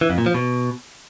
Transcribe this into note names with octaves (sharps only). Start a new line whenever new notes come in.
E3
F2
A#2
F3
B2